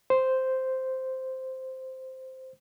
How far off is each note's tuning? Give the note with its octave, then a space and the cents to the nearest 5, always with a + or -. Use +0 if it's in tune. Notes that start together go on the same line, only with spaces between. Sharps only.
C5 -5